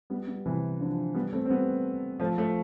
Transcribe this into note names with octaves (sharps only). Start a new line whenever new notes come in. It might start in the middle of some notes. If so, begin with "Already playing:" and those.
G3 B3
G3 B3
C3 E3
D3 F3
G3 B3
A3 C4
C4
G3 B3
F3 A3
F3 A3